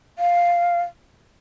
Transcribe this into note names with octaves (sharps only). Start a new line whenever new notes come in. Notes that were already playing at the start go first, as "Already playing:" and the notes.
F5